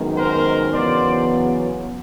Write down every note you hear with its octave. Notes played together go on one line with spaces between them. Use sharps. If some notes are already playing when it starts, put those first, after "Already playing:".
Already playing: F#2 D#3 G#3 B3
A#4 C5
E2 C#3 F#3 B3 C5 D5